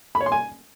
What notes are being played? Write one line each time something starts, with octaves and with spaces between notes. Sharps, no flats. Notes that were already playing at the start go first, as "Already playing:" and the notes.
B5
C#5
C6
G#5